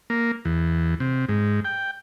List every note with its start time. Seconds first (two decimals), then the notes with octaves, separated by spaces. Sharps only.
0.10 A#3
0.45 E2
1.00 C3
1.29 G#2
1.65 G5